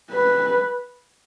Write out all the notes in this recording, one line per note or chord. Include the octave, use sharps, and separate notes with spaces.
B4